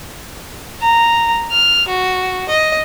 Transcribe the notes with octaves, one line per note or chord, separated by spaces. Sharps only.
A#5
F6
F#4
D#5